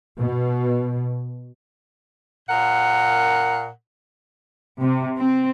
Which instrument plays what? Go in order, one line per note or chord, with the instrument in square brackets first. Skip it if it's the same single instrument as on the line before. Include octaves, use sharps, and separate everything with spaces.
[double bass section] B2
[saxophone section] A#2 A#4 F#5
[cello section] C3
C4